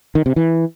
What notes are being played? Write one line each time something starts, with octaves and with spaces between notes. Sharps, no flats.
D#3
C3
E3